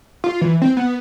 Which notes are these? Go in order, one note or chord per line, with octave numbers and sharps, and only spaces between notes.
F4
E3
C4
B3